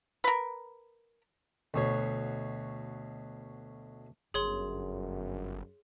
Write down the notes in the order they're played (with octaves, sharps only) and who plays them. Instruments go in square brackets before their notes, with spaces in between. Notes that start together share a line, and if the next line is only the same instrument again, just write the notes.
[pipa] A#4 B4
[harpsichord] D2 B2 C#5
[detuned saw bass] G1 [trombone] F#2 [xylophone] G#4 C#5 C6